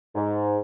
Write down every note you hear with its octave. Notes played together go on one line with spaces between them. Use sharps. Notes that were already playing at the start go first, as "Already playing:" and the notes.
G#2